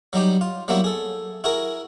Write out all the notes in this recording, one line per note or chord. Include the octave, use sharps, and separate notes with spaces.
F#3 G3 D#4 G4
F4
F#3 G3 A#3 B3 E4 F#4
G#4 A4
E4 F#4 G#4 A#4